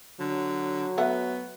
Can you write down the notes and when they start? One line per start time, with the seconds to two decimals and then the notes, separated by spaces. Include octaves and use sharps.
0.20 D3 F#3
0.98 A3 B3 E5 F#5